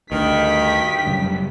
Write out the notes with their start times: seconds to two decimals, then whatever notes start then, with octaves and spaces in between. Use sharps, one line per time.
0.12 D2 G2 D#3 G4 B6
1.06 F#2 C#3 G3